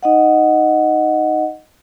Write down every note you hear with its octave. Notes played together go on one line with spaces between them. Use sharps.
D#4 D#5 F#5